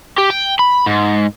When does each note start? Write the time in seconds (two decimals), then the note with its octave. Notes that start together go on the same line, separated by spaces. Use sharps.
0.18 G4
0.30 G5
0.59 B5
0.86 G#2